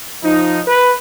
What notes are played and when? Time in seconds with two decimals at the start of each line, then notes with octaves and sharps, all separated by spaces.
0.24 F3 D#4
0.67 B4